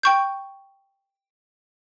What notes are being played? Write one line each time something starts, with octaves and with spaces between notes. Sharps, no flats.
G5 C#6 G6